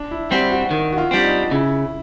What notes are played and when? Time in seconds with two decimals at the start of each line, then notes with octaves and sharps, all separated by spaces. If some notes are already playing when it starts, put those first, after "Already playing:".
Already playing: D4
0.11 E4
0.30 G3 C4 F#4
0.51 F#4
0.71 D#3
0.92 F#4
0.98 F4
1.11 G3 C4 D4
1.24 D#4
1.51 C#3 E4